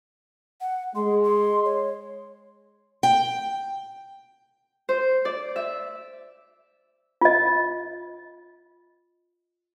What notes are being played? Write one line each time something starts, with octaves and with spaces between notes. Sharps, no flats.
F#5
G#3 C6
C6
C#5
G5
C5
D5
E5
F4 D#5